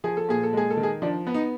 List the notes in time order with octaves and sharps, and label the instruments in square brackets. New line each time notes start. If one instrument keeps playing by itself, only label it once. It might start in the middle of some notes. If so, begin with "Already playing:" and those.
[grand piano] F3 G#4
A4
A#2 G#4
A4
G#3 G#4
A4
D#3
G#4
F3 D4
B3
D#4